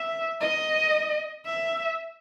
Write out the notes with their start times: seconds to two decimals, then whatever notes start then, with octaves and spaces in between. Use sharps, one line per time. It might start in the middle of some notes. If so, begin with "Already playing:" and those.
Already playing: E5
0.41 D#5
1.47 E5